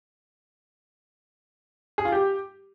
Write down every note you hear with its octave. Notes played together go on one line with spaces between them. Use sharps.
G#4
F4
G4